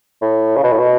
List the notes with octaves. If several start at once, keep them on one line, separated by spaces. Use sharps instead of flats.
A2
C#3
B2
A2
B2